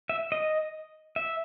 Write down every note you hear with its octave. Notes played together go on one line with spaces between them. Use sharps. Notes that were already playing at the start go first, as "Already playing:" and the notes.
E5
D#5
E5